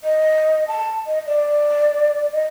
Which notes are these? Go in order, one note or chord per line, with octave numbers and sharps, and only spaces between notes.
D#5
A5
D#5
D5
D#5